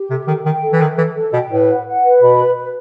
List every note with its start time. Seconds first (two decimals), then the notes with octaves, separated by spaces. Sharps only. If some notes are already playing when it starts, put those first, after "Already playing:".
Already playing: G4
0.10 C3 A4
0.27 D#3 A4
0.45 D#3 G5
0.62 A4
0.72 E3
0.80 D#3 E5
0.97 E3 A4
1.16 A4
1.33 B2 G5
1.50 A2 B4
1.68 F#5
1.85 F#5
2.04 B4
2.21 B2 B5
2.39 B4
2.56 B4